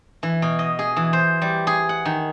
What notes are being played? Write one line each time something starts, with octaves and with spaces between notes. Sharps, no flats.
E3
B2
D#5
G#4
E3
C5
G3
G#4
F#5
D#3